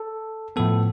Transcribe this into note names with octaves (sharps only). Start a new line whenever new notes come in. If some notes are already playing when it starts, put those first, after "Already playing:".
Already playing: A4
A2 F3 B3 A4